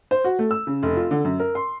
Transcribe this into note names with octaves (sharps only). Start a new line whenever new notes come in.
C5
F#4
A3
E6
C#3
F1
F4
D3
F#2
A#4
C6